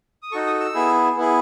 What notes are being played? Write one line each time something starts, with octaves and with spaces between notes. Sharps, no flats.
D#6
D#4 F#4 A4 C#6
D#6
E6
B3 E4 G#4
B3 E4 G#4